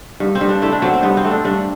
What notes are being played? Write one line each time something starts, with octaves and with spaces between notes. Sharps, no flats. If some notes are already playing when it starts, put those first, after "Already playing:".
G2
C4
G2
D4
A3 E4
D4
F#3 C4
C4
G2 B3
C4
A3
D4
G2 D4